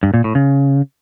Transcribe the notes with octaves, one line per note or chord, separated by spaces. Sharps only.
G2
A#2
A2
C#3